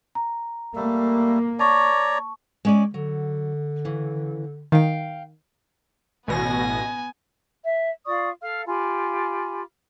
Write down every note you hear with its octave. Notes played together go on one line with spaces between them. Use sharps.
A#5
G3 A3 A#3
C#5 D5 A5 A#5 C#6
G#3 C#4 D5
D3 F#3
C#3 E3
D#3 F5 G5
A1 B2 B3 G#5 A#6
E5
F4 D5 C#6 D#6
A4 F5 F6
F4 G4 G#5 B5